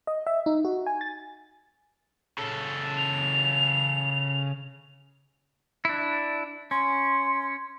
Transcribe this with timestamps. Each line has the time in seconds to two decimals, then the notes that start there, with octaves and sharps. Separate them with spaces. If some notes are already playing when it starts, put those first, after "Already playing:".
0.07 D#5
0.27 E5
0.46 D#4
0.65 F#4
0.86 G#5
1.01 A6
2.38 C#3 A4
2.97 F7
5.85 D4 E4
6.71 C#4 C6